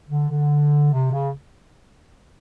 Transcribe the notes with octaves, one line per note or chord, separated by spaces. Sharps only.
D3
D3
C3
C#3